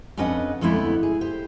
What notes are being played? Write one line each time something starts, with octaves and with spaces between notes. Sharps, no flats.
F2 C#4 D4 B4 D#5 F#5
F2 D3 G#3 A3 B3 E4
G#4
G4 C5